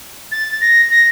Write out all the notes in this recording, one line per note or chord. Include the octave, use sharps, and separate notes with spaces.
A6
A#6
A#6